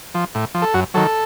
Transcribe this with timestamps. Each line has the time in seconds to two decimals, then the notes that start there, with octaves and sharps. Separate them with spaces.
0.15 F3
0.35 A2
0.54 F3
0.62 A4
0.74 F#2 F#4
0.94 D#3 F#3 A4